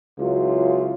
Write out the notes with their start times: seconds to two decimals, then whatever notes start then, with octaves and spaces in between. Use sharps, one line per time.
0.19 C#2 F#3 E4 F4